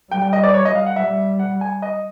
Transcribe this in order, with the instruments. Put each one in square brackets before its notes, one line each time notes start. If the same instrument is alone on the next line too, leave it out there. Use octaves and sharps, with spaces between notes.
[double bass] G3 [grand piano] G5
[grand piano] G5
D#5
D5
C#5
D#5
F5
F#5
[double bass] G3 [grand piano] E5
[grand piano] F#5
G#5
D#5